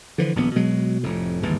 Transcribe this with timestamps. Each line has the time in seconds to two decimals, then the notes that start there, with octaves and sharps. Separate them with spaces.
0.18 D3 E3 F3
0.35 D#1 A#1 G#2 B3
0.55 B2 F#3 G#3
1.03 F1 F2 A2
1.43 G1 D#2 G#2 E3